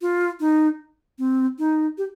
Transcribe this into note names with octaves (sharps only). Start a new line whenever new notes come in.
F4
D#4
C4
D#4
G4